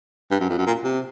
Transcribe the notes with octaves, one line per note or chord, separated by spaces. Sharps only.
G2
F#2
F2
F#2
A#2
C3